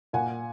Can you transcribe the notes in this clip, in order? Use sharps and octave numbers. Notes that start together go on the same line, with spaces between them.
A#2 F#5 G#5